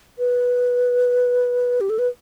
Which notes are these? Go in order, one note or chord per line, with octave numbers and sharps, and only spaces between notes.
B4
G4
A4
B4